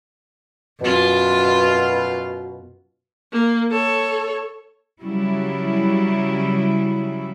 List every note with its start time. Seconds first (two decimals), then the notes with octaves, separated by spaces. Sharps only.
0.81 F#2 B2 F4
3.32 A#3
3.71 A4 C#5
5.01 C#3 F#3 G3 E4